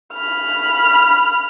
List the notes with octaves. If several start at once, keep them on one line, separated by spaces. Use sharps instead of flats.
B5 F6